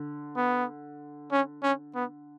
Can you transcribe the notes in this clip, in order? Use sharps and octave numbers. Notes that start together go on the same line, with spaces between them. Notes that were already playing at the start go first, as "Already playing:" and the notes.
Already playing: D3
B3
C#4
C#4
B3